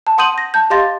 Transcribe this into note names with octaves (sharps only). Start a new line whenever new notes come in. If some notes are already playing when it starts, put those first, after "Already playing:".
A5
F#5 C6 D#6 G6 D#7 F#7
A#6
A5 G6
G4 D#5 F5 C6 A6 A#6